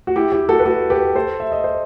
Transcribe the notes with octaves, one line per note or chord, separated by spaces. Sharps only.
F#4
E4 G4
E4 G4
F#4 A4
B4
F#4 A4
G4 B4
A4 C5
E5
D#5
C5